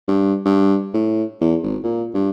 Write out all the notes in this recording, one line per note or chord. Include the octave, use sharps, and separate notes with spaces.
G2
G2
A2
E2
G#1
A#2
G2